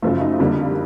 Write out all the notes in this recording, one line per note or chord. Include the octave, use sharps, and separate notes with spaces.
F#2 C#3 F3 A3
D#4
F2 D3 G3 A#3